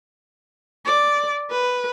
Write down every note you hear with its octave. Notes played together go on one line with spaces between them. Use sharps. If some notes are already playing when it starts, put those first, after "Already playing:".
D5
B4